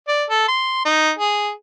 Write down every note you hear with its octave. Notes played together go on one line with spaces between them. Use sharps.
D5
A4
C6
D#4
G#4